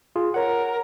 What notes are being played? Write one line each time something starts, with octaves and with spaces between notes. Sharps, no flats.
F4 G#4
A#4 C#5 F#5